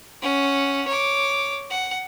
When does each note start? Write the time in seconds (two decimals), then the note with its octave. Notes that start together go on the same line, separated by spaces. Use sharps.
0.23 C#4 F#5
0.88 C#5 D6
1.71 F#5